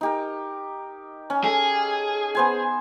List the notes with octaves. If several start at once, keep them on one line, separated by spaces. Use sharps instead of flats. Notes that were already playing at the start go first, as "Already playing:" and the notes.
D#4 G4 A#4
C#4
G#4 A4
B3 C5 G#5